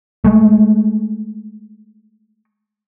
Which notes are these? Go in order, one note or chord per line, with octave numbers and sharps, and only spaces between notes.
G#3 A3